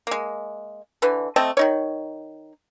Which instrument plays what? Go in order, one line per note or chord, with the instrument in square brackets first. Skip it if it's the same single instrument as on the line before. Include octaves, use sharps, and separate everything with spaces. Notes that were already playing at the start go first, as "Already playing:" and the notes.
[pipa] G#3 A#3
D3 E3 B4
A3 C4 D#5 A5
D#3 D#4 C#5